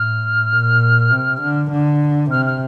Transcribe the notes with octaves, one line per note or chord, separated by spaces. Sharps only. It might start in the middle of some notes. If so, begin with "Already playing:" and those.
Already playing: A2 F6
A#2
C3
D3
D3
C3 F6
F6